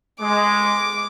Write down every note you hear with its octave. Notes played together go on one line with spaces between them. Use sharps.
G#3 D6